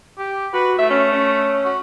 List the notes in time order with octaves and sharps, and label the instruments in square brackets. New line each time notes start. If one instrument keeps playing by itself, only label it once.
[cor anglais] G4
[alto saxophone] F#4 [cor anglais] B4
[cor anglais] A3 [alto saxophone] E5
[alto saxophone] C#4
C#4
[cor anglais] F#4